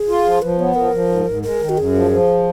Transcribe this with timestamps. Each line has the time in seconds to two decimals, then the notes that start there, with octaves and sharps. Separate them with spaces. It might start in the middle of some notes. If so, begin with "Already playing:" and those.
Already playing: G#4
0.09 F4
0.25 F3
0.42 F3 B4
0.59 B3 C#5
0.76 F3 A#4
0.93 F3
1.09 G#2
1.26 G#2
1.43 G#3 A#4
1.60 D#3
1.69 F#4
1.77 F#2 G#4
1.94 F3
2.11 F3